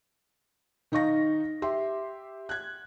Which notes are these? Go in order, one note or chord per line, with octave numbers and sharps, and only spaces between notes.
D#3 D#4 F5 C#6 A#6
G4 E5 C6
F#6 G#6